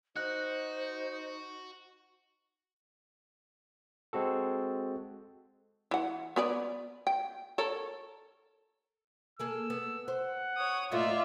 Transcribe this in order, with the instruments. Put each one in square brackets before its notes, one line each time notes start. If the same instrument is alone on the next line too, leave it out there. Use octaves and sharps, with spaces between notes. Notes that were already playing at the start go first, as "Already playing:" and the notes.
[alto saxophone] D#4 [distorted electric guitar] F#4 [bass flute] C5 [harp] F#6
[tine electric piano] G#3 C4 F#4 A4
[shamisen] E3 F#5
B3 B4 D5
G5
A4 A#4 C#5
[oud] A#3 G#4 A4 [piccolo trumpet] E6
[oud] B3
[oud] C5 [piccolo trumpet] F#5
[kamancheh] C#5 D#6
[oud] A2 A#3 D#4 [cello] F4 [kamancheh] D5 E5